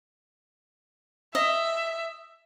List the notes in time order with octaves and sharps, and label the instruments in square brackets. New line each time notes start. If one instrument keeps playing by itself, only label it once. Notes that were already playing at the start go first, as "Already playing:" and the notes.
[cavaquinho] D#5 [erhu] E5